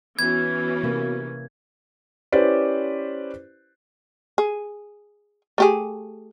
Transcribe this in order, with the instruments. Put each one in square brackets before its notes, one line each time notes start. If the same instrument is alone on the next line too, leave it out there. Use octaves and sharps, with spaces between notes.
[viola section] E3 C#4 [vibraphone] B3 F#4 [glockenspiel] G#6
[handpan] C3 A#3
[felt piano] C#4 E4 G4 B4 C5 D5
[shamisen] G#4
A3 G4 G#4